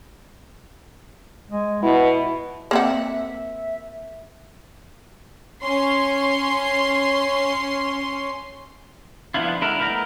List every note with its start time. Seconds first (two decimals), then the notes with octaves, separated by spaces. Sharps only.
1.50 G#3
1.83 B2 E4
2.71 A#3 C4 E5 F#5
5.65 C#4 C6
9.34 F3 B3 D4 E4 F4
9.61 D3 G#3 D4 E4 A#4
9.79 A3 B3 E4 A#4 A#5